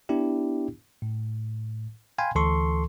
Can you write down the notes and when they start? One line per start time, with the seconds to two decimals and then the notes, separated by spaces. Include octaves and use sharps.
0.09 B3 D4 E4 G4
1.02 A2
2.18 F5 G5 G#5 B5 C6
2.35 D2 E3 A4 C6 C#6